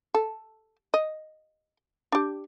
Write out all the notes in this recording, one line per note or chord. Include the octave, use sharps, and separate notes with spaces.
A4
D#5
D4 G4